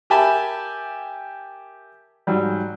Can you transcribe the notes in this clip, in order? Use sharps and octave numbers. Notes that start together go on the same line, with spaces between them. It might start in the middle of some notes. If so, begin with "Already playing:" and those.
G4 A#4 E5 G#5 A5 B5
G#2 F#3 G3